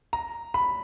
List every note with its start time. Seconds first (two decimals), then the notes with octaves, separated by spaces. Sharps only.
0.13 A#5
0.54 B5